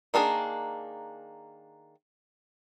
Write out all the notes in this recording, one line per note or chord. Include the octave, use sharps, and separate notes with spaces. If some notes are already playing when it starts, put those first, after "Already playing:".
D#3 A#3 D4 F4 G#4